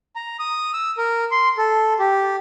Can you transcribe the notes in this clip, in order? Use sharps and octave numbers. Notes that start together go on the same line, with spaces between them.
A#5
D#6
E6
A#4
C6
A4
G4